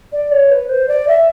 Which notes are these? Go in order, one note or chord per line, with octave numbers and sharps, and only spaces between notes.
D5
C#5
B4
C5
D5
E5